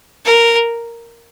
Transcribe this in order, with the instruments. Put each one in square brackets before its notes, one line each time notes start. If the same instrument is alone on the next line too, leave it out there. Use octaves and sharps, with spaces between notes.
[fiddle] A#4